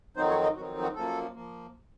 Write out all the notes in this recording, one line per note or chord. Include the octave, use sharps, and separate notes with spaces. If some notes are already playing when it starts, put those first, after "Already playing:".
F2 D#3 F#3 C4 D#4 C5
C#5
D#5
F2 D#3 F#3 C4 D#4 F#4
F#4
F#2 F3 A#3 A4
F3 A#3